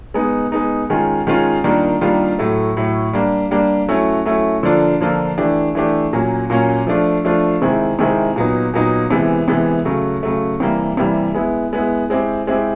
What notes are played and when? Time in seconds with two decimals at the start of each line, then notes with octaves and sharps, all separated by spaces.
0.14 G#3 B3 D#4
0.52 G#3 B3 D#4
0.90 D#3 G#3 C#4 F4
1.27 D#3 G#3 C#4 F4
1.64 D#3 G3 A#3 D4 F4
2.01 D#3 G3 A#3 D4 F4
2.39 A2 F#3 A3
2.77 A2 F#3 A3
3.13 G3 A#3 D4
3.51 G3 A#3 D4
3.88 F#3 A3 C#4 E4
4.25 F#3 A3 C#4 E4
4.63 D3 F3 A#3 D4 F4
5.00 D3 F3 A#3 D4 F4
5.38 E3 A3 D4 G4
5.75 E3 A3 D4 G4
6.13 A#2 F#3 A#3 C#4
6.50 A#2 F#3 A#3 C#4
6.87 F3 A3 D4 F4
7.25 F3 A3 D4 F4
7.62 C3 D#3 G#3 C4 E4
7.99 C3 D#3 G#3 C4 E4
8.36 A#2 F#3 B3 D#4
8.74 A#2 F#3 B3 D#4
9.11 C3 E3 G#3 B3
9.48 C3 E3 G#3 B3
9.85 C#3 F#3 A3
10.23 C#3 F#3 A3
10.60 C3 E3 G3 A#3
10.97 C3 E3 G3 A#3
11.34 G#3 B3 E4
11.73 G#3 B3 E4
12.10 G#3 C4 E4 G4
12.47 G#3 C4 E4 G4